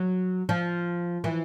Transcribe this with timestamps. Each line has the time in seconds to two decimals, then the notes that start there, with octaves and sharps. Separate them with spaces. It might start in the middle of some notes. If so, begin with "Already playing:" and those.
Already playing: F#3
0.49 F3
1.24 E3